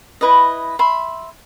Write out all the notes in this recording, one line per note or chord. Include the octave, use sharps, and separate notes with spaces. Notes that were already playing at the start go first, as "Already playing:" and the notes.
E4 B4 D#5
E5 B5 C6